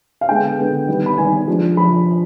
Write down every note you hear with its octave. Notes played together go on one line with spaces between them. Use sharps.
F5
D3 G#3 B3 G5
D3 G#3 B3
D#3 G3 B3
B5
D#3 G3 B3 G#5
F3 G#3 D4
F3 B5